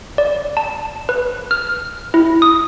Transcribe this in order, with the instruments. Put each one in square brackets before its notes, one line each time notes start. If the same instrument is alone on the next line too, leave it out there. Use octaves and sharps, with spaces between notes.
[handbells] D5
A5
B4
F6
E4
D#6